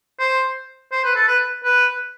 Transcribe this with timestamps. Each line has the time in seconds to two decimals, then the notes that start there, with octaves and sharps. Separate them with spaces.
0.20 C5
0.92 C5
1.04 B4
1.15 A4
1.27 B4
1.64 B4